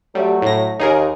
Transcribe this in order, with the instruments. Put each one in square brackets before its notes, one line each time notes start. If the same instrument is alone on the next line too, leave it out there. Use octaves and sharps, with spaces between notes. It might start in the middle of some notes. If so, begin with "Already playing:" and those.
[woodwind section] F#3 A3 [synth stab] G3
[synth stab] A2 A#6
[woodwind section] D#2 [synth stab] D#4 G#4 A#4